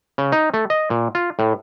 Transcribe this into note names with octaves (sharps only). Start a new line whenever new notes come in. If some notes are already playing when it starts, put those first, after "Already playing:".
C#3
D#4
A3
D#5
A#2
F4
A2